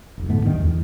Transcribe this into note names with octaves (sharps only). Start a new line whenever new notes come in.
F1 B1
D2 G#2 A3 B3
D2 D#3 G3 C4
E2